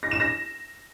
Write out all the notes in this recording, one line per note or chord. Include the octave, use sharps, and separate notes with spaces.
A#6
E7
A#6